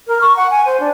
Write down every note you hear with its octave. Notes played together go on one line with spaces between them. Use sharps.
A#4
C#6
F#5
G#5
C5
D4